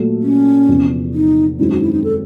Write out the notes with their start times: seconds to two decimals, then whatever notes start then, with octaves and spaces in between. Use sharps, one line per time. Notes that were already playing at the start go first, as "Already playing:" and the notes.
Already playing: A#2 F#3 A3
0.22 C#4
0.68 E2 C3 F3
1.14 D#4
1.59 F#2 D#3 G#3 C4 E4
1.70 F#4
1.82 E4
1.93 D#4
2.04 A4